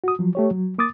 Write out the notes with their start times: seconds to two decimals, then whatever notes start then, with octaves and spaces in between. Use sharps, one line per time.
0.04 F#4 D#6
0.19 F3 F#3
0.35 A3 G4 C#5
0.51 F#3
0.78 A#3 D6 D#6 A6